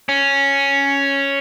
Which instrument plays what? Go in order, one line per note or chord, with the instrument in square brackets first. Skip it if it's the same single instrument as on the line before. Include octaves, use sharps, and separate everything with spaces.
[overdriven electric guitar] C#4